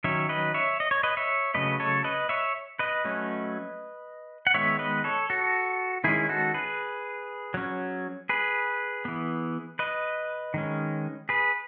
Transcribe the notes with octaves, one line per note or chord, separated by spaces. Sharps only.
D#3 F#3 C#4 C#5 E5
B4 D#5
C#5 E5
D#5
C#5
B4 D#5
C#5 E5
C#3 F#3 A3 B4 D#5
A4 C#5
B4 D#5
C#5 E5
B4 D#5
F#3 A3 C#4
F#5
D#3 G#3 B3 C#5 E5
B4 D#5
A4 C#5
F#4 A4
D#3 G#3 C#4 E4 G#4
F#4 A4
G#4 B4
F#3 C#4
G#4 B4
E3 B3
B4 D#5
D#3 G#3 C#4
G#4 B4